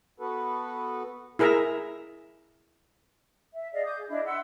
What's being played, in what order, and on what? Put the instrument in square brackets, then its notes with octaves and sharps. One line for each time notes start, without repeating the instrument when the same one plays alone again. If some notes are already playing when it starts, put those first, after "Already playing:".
[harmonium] B3 F#4 A4 B4
[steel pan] E4 G#4 A#4 E5 A#5
[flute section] E5
G#4 D5 D#5 F5
D6 D#6 G6
G#4
D4 E4 D#5
E5 F#5 C6 E6